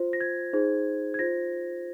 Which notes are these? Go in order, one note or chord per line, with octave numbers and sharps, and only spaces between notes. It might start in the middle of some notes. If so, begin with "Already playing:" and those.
Already playing: F4 C5
A#6
G#6
D#4 G#4 C5
G#6
F4 C5 A#6